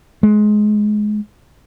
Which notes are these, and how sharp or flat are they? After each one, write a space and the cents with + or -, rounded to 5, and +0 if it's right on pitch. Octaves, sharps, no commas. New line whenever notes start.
G#3 +20